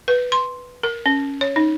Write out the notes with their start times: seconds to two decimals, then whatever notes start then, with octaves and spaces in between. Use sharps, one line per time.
0.08 B4
0.32 C6
0.83 A#4
1.06 C#4
1.41 C#5
1.56 D#4